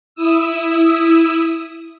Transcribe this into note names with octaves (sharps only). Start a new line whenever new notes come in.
E4 D#6 E6